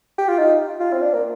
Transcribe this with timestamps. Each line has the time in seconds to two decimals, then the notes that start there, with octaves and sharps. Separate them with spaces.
0.18 G4
0.28 F4
0.39 D#4
0.80 F4
0.93 C4
1.02 D4
1.14 A#3